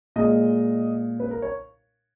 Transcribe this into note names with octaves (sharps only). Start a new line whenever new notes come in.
A#2 G#3 D#5
B4
A#4
C#5